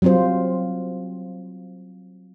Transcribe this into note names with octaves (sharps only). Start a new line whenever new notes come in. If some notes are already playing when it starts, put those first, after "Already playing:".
F#3 G3 C4 F4 C5